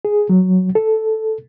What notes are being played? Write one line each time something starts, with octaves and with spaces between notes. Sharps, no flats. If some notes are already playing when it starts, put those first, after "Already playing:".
G#4
F#3
A4